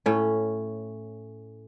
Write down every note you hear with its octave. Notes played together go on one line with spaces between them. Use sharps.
A2 C#4